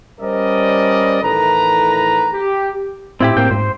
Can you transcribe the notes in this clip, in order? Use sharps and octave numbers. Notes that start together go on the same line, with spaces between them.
G3 C#4 A#4 C5 D5 D#5
A2 D#3 E3 A4 B4 A#5
G4
A2 C4 E4 G4
A2 A#3 C4 G5
G#2 C5